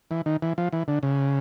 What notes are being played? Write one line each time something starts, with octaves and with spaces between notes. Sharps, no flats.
E3
D#3
E3
F3
E3
D3
C#3